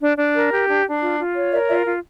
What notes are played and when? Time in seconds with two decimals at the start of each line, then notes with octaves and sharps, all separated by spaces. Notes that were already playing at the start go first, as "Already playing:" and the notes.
0.01 D4
0.17 D4
0.34 A#4
0.51 G4
0.67 D4
0.85 D4
1.01 F4
1.19 F4
1.34 C#5
1.51 A#4 D5 E5
1.68 F4 D5 E5
1.85 F4